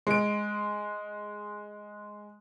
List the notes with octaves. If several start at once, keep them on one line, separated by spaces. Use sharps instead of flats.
G#3 D7